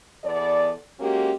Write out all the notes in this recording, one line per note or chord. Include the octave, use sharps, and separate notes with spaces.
E2 B3 A4 D5
G#3 A#3 C#4 F#4 G4 A#4